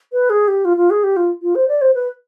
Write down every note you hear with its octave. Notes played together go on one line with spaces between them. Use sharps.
B4
G#4
G4
F4
F4
G#4
G4
F4
F4
C5
D5
C5
B4